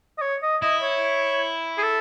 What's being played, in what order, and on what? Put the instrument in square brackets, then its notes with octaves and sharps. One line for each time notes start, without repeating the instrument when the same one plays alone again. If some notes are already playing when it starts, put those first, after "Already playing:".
[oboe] D#5
C#5
D#5
[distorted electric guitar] E4 [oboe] D#5
[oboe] C#5
G#4
A4